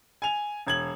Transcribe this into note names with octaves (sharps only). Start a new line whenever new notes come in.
G#5 F7
E1 G#6 F#7